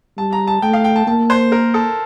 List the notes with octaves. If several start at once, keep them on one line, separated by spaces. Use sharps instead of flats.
G3 A5
A#5
A5
A3 G5
F5
G5
A5
A#3 A5
C5
A#4
A4